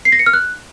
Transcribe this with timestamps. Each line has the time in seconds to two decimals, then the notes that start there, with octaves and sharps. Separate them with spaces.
0.05 C7
0.12 A#6
0.19 C#7
0.26 F6
0.33 F#6